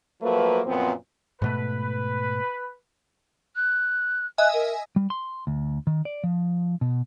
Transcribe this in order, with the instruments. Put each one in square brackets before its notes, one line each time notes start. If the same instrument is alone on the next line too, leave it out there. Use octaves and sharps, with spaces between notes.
[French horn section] F3 F#3 A3 A#3 B4
F#2 A#2 F3 B3 C4
[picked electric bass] G#2 B2 A3 [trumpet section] B4
[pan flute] F#6
[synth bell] D#5 E5 G#5 [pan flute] F#6
[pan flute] A#4
[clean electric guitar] G3
C6
D2
D#3
D5
F3
B2